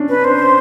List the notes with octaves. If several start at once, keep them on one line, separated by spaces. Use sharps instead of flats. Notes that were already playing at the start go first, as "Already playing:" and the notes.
Already playing: C#4 D4
B4
C5